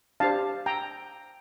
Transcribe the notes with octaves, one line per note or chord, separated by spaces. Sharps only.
D4 G4 C5 F5 A5
G5 A#5